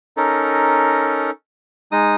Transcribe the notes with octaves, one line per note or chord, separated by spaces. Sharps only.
C#4 D#4 A4 A#4
G#3 D#4 D#6